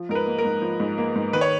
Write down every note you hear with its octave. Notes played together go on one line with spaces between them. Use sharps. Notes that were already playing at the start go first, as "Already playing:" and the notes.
Already playing: F3
G#2 A#4
B4
A#3
A#4
G#2
F3
G#2
A#3
G#2
D#3 B4
C#5